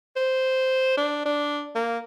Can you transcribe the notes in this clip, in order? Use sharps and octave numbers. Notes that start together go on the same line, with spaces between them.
C5
D4
D4
A#3